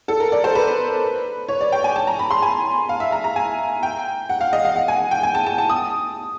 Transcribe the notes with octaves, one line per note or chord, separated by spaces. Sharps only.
A4
A#4
D5
C5
B4
C#5
D5
G5
G#5
A5
A#5
B5
C6
G#5
F5
E5
A#5
A#5
G#5
G5
F#5
F5
D#5
F5
F#5
G#5
G5
G#5
A5
A5
A5
D#6